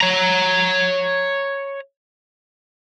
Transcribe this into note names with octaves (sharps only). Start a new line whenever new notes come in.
C#5 A#5